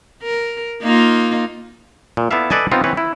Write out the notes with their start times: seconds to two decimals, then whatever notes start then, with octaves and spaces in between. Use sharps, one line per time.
0.23 A#4
0.82 A#3 D#4 F4
2.17 A#2
2.31 B3 E4 A4 D5 E5 F5
2.50 A4 B4 D5 D#5 G#5 A5
2.72 B3 C4 D#4 F4
2.84 E3 C4 B4 C#5
2.97 E4